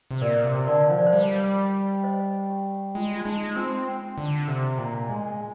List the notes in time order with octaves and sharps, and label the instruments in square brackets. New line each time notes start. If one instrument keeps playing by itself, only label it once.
[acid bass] C3
[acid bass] A#2 [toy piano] A#4 D5
[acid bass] C3
[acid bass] D3 [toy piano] A#4 D5
[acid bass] F3 [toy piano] C5
[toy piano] D5
C5
[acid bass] G3
[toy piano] C5 D#5
G4
[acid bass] G#3 [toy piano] F4
[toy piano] F4
[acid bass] G#3 [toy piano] D#4
[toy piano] D#4
[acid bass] C4 [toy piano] F4
[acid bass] D3
C3
A#2
G#3